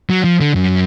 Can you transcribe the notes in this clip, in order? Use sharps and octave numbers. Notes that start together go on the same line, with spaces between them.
F#3
F3
D3
F#2